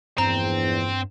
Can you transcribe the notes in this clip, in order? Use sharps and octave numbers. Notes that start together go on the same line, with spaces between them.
A#1 E2 G2 C4 A#5